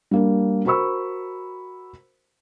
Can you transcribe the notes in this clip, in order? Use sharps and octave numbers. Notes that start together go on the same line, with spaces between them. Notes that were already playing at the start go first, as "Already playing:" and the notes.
G3 A#3 D4
F#4 A#4 C5 B5 C#6 E6